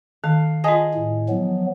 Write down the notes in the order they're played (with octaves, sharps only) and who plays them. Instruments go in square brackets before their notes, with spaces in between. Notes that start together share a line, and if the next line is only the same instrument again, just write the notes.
[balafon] D#3 [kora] F5
[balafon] F4 A5 [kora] G#4 D#5
[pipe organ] A2
F3 F#3 B3